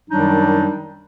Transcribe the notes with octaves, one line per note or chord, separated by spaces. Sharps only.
F#2 D#3 F#3 G3 D4 D#4